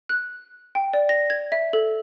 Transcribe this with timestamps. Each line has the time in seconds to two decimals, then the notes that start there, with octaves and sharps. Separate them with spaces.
0.09 F#6
0.75 G5
0.93 D5
1.09 A#6
1.30 G#6
1.52 E5
1.73 A4